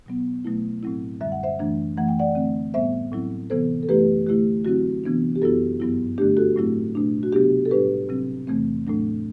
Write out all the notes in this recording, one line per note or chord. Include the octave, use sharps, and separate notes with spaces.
B2 F#3 B3
B2 F#3 A3 E4
A2 F#3 C4 E4
F#2 D3 G3 E5
F#5
C5 E5
F#2 E3 A3 D4
F#2 E3 A3 F#5
G5
D5 F#5
D3 A3 C4
A2 G3 B3 C5 E5
A2 F#3 C4 E4
C3 E3 B3 A4 C5
A4
F#2 E3 A3 E4 G4 B4
D3 A3 E4 G4
D3 F#3 C4 E4 F#4
C3 E3 B3 D4
G4
F#2 F#3 B3 E4 F#4 A4
G2 F#3 B3 E4
D3 A3 D4 G4
F#4 A4
A2 F#3 A3 C4 E4
B2 A3 D4
F#4
C3 F#3 B3 D4 G4
A4
A2 G3 D4 G4 B4
C3 F#3 C4
E2 C3 E3 A3 C4
A2 F#3 A3 D4